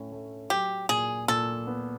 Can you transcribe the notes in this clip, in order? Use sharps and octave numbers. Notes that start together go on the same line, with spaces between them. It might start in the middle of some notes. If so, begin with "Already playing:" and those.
Already playing: A2 C#4
A3
F#3 G4
A#2 G#4
A#2 A4
B3